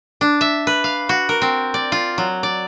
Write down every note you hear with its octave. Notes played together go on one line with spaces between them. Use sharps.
D4
E5
B4
F5
F#4
A#4
C4
D5
F4
F#3
D5